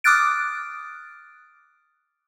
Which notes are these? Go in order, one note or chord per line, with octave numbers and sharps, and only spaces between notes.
D6 D#6 F6 F#6 A6 D7